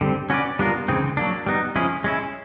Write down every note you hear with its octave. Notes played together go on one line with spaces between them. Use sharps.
D3 G3 C4
C#4 F#4 B4 D5
G3 B3 D4 F4 A#4
C#3 E3 G#3 C4 D#4
F#3 A#3 D4
G3 B3 D#4
F3 G#3 C#4 E4 G#4
G#3 C#4 E4